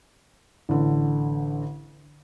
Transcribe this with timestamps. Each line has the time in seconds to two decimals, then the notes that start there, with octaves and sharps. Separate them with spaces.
0.69 A1 D3